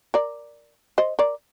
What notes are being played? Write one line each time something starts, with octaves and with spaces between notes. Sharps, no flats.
A#4 D5
C5 D#5
A#4 D5